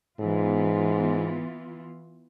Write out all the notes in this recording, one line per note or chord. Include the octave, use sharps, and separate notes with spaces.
G#2 E3 B3 F4